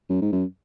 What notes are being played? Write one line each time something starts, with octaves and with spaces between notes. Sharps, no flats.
F#2
G#2
F#2